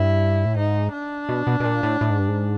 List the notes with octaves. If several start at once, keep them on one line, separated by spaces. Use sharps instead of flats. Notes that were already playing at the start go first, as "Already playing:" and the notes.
Already playing: G2 E4
A2
G#2 D#4
D4
B2
B2
B2
A#2
A2
A2
G#2
G2
G#2